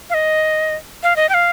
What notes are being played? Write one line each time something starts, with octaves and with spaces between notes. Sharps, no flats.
F5
D#5
F5
D#5
G5
F5